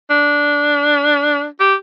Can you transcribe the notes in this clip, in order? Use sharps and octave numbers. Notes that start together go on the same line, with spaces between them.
D4
G4